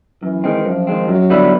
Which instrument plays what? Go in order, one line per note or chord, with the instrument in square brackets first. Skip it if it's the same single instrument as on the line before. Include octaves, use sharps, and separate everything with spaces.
[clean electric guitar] F#2 [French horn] E3
[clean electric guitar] D#3 G#3 C4
[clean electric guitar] F#2 [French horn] F3
[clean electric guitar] D#3 G#3 C4
[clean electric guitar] F#2 [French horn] F#3
[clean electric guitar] D3 G3 B3 E4